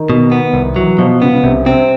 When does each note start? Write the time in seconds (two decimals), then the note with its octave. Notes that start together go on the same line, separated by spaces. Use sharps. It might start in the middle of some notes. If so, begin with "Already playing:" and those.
Already playing: D#3
0.10 B2
0.32 B3
0.54 C2
0.76 E3 F#3
0.98 B2 F3
1.21 C#3 B3
1.33 C#3
1.44 C2 C3
1.66 C3 C4